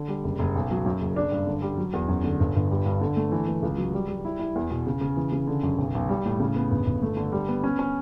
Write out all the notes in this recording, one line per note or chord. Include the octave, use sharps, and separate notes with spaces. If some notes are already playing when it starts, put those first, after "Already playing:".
Already playing: D3
G3
F#1
F#1
B1
F#3
F#2
F#1
D4
G2
D3
G3
F#3
E2
F#2
D3
G1
G1
G3
G2
D3
A3
E3
E3
C#2
F#3
G3
G3
E4
E4
E2
B2
C#3
C#3
E3
C#3
D3
F#2
B1
B1
G3
A2
C#3
B3
G1
G1
A3
D3
G3
B3
C#4
C#4